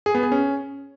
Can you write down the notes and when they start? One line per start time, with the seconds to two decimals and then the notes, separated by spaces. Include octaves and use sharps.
0.06 G#4
0.15 B3
0.23 G#4
0.32 C#4